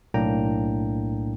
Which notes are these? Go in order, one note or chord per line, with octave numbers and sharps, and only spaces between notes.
B1 A2 A#3 D4 G5 A#5